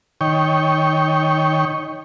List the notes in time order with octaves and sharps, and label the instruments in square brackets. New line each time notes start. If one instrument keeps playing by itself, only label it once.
[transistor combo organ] D#3 C#5 G5